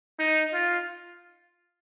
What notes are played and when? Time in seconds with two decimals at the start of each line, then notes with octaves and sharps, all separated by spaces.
0.19 D#4
0.53 F4